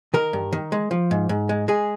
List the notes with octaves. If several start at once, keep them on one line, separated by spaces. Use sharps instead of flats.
D#3 A#4
G2
D#3
G#3
F3
G#2
G#2
G#3
G#3 G#4